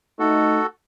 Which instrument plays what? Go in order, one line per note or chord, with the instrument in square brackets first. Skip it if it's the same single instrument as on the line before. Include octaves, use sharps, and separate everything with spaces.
[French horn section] A3 D#4 [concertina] F#4 A4